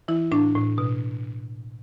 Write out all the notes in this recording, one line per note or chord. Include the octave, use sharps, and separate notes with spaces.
E3 E4
A2 D4
A2
B2